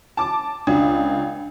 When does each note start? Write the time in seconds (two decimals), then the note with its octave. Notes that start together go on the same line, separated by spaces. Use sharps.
0.17 A5 D6
0.67 C#2 D4